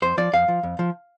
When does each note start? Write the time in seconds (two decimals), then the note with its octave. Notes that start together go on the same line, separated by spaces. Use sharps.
0.02 F2 C5
0.18 F3 D5
0.33 F2 F5
0.48 F3
0.63 F2
0.79 F3